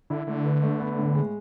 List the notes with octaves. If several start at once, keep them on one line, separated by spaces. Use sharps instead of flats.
D3 E4
D3 A3
B4
A3
B3
A2
G#3